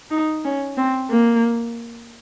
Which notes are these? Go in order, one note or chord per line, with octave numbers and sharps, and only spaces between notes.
D#4
C#4
C4
A#3